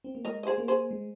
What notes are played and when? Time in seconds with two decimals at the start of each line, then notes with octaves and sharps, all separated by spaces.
0.04 C4
0.15 A#3
0.25 G#3 A#4 D#5
0.43 D#5
0.47 G#4 C5
0.58 A#3
0.68 G#4 C5
0.91 G#3